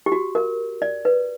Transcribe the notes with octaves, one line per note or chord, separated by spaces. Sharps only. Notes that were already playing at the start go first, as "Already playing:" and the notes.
G4
F#4
A#4
D5
B4